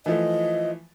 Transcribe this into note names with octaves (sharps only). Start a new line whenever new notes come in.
E3 F3 A3 D#5